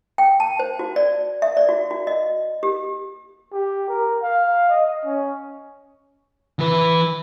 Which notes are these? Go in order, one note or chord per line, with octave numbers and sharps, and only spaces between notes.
G5
A5
C5
F#4
D5
E5
D5
F#4
F#4
D#5
G4
G4
A#4
F5
D#5
C#4
E3 B4